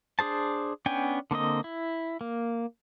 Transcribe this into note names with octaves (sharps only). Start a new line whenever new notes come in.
D4 G#4 C5 A5
B3 C#4 D4 G5 G#5
D3 A#3 C4 D#5
E4
A#3